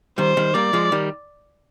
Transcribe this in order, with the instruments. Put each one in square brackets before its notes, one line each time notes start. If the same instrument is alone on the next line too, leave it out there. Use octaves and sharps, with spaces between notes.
[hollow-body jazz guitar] D#3 G3 [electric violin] C5
[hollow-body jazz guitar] D#3 G3
[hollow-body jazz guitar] G3 A#3 [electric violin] D5
[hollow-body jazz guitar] F3 G#3
D#3 G3